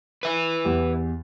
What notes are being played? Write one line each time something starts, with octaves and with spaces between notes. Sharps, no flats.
B4 E5
E2 G4